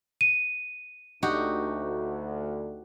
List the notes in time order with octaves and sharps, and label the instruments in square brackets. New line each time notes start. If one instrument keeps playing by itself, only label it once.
[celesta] D#7
[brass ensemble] D2 [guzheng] D#4 F#4 G4